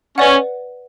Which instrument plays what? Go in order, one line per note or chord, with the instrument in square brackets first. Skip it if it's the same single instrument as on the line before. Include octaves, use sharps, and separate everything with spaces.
[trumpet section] C#4 [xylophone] B4 D5 F#5